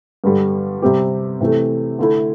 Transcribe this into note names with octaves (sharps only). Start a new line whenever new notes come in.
G2 D3 G3
C3 G3 C4 G4
C3 E3 A3
D3 A3 E4